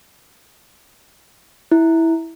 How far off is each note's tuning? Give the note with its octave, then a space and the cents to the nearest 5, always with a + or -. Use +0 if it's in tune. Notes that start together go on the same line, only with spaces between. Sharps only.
E4 -10